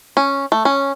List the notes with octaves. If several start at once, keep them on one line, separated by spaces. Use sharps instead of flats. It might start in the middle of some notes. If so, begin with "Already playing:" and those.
C#4
A3
C#4